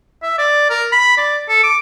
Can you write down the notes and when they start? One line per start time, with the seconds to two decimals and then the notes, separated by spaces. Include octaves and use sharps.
0.23 E5
0.38 D5
0.70 A#4
0.92 B5
1.18 D5
1.49 A4
1.64 D6